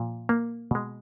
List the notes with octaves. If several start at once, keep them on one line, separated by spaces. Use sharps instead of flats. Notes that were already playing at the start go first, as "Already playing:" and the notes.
Already playing: A#2 F3
A#3
B2 G#3